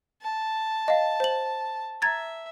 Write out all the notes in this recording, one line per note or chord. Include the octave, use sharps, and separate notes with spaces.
A5
D#5 F5
C5 F#7
E5 A#5 G#6 A6